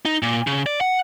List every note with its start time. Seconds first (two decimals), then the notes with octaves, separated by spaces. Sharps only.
0.05 D#4
0.22 A#2
0.47 C#3
0.66 D5
0.81 F#5